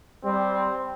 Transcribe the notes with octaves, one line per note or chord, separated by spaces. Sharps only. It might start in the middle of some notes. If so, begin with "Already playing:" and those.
G3 C4